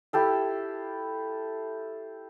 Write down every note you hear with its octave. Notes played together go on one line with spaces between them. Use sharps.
E4 G4 A4 F5